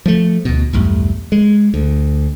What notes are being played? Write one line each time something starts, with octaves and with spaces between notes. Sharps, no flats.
F3 A3
D2 B2
B1 E2 G2 A3
G#3
D2